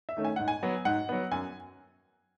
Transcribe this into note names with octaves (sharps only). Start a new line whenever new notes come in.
E5
D#3 A3 C#4
G#5
G#2 F#5
G#5
F#3 B3
G#2 F#5
F#3 B3
F#2 G#5